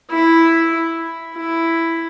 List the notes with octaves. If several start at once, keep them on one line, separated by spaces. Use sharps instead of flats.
E4
E4